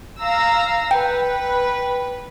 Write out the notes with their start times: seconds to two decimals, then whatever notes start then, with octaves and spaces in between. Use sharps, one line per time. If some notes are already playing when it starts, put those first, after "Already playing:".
0.20 F5 A#5 E6
0.91 B4 G5